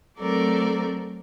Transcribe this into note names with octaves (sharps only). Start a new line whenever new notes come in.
F#3 A3 C4 A4 A#4 D5